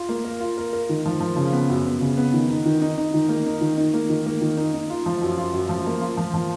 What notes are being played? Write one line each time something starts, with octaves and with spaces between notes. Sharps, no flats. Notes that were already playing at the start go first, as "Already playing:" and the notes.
Already playing: F4
A#3
A#4
F4
A#4
A#4
D#3
F3
F3
C#3
B3
F#2
B3
C#3
B3
D#3
D#4
D#3
D#4
D#4
D#3
A#3
D#4
D#3
D#4
A#3
D#3
A#3
D#3
D#4
D#4
F4
F3
F#2
F4
F#2
F3
A#3
F4
F3
F3